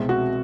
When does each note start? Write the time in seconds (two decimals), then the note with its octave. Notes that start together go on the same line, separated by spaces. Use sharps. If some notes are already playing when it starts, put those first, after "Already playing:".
Already playing: C2 B2 G#3 C4
0.09 F#4